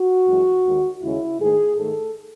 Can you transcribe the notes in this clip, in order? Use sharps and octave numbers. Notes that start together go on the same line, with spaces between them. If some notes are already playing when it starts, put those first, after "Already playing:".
Already playing: F#4
F#2 E3 G#3
D#2 D#3 G#3
D#2 C#3 G#3 C#4 E4
G#2 D#3 A3 G#4
G#2 D#3 A3 A4